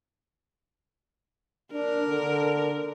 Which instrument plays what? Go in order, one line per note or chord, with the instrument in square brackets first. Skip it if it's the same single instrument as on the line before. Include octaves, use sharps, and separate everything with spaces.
[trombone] D4 [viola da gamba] A#4
[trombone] D3